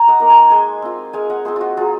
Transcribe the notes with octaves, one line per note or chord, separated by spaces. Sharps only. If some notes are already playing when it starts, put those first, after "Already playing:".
Already playing: G#5 A#5
D#5 F#5
A#3 D#4
G#5 C6
G#3 G#5 C6
C4 F4
G#3 F5 G#5
D#5 F#5
C4 F4 G#4 C5
F4 F#4
F#3 F4 G#4